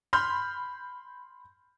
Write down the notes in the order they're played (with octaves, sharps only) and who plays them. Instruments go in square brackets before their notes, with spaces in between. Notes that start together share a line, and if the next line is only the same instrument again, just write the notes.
[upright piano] B5 C6 F6 G6